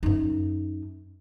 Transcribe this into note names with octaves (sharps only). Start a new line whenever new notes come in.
F#2 D#4